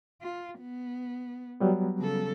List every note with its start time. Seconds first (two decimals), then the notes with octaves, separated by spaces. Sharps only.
0.22 F4
0.60 B3
1.60 F#3 G3 B3
2.00 C#3 A4